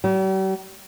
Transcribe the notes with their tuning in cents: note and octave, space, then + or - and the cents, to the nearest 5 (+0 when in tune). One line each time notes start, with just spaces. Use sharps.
G3 -45